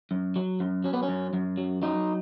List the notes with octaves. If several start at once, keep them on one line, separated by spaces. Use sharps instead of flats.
F#2
F#3
F#2
F#3 C#4
B3
C#4
F#2
F#2
F#3
F#3 D#4